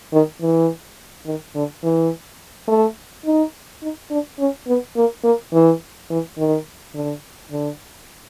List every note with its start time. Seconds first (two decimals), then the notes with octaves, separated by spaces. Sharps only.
0.13 D#3
0.41 E3
1.26 D#3
1.55 D3
1.83 E3
2.68 A3
3.26 D#4
3.82 D#4
4.11 D4
4.39 C#4
4.67 B3
4.96 A#3
5.24 A#3
5.53 E3
6.10 E3
6.38 D#3
6.94 D3
7.51 D3